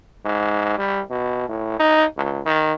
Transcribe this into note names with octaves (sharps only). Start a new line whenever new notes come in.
G#2
G3
B2
A2
D#4
C#2
D#3